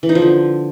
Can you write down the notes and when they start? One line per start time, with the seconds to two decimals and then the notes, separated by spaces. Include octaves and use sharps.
0.03 E3
0.09 D#4
0.15 F3
0.22 D3